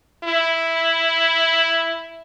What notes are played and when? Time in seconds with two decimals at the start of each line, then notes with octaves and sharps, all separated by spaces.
0.24 E4